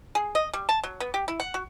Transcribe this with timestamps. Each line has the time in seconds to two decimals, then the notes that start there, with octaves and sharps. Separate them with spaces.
0.15 G#4
0.35 D#5
0.53 G3
0.69 A5
0.84 F#3
1.00 B3
1.14 G4
1.28 E4
1.40 F#5
1.54 F#4